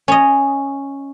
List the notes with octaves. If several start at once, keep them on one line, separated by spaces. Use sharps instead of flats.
C#4 D#5